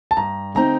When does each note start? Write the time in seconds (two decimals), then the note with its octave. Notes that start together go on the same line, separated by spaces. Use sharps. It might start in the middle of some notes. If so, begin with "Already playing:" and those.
0.11 A5
0.17 G2 A#5
0.55 D3 A3 C4 D#4 A#5